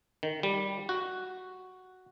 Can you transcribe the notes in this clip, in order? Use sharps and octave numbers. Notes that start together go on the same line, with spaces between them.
D#3
G3
F#4